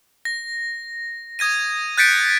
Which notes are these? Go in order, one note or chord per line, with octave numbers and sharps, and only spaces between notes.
A#6
D#6 G#6 A#6 D#7
F#6 G6 A6 B6 C#7 D7